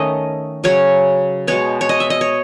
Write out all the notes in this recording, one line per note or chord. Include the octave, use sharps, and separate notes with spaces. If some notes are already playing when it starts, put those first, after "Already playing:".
Already playing: D#3 A3 C#4 D#5
C#3 F#3 C#4 C#5
B2 G#3 B3 C#5
C#5
D#5
E5
D#5
C#5